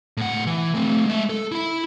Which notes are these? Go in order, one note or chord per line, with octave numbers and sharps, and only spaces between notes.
A2 F#5
E3
A3 C4
G#3 E5
A4
E4 B5